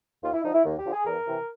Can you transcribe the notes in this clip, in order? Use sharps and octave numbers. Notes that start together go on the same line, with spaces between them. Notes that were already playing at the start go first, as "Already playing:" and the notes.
D#2 F4
E4
D3 F3 D#4
E4
D#2
G4
D3 F3
G#4
E2 A#4
C3 E3